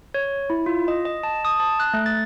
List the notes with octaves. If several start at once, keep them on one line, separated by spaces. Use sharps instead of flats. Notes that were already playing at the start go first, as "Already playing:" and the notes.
C#5
E4
F4
D#5
D#5
A5
D#6
A5
F#6
A3
A6